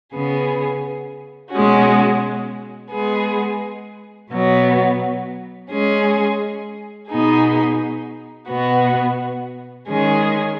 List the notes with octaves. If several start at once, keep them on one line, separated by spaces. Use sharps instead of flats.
C#3 B3 G#4
B2 G#3 C#4 F#4
G#3 B3 G#4
B2 F#3 B3
G#3 C#4 G#4
B2 B3 D#4 G#4
B2 B3 F#4
D#3 G#3 C#4 G#4